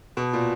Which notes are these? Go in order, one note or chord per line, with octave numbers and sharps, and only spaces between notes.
B2
A#2